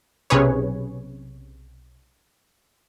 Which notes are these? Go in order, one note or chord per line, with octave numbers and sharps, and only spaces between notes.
B1 C3 C#4 G#4 B4 C#5